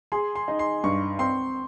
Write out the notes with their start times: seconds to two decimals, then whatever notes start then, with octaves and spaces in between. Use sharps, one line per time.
0.12 G#4 C6
0.35 C6
0.48 D#4
0.59 C6
0.84 G2 C#6
1.19 C4 C6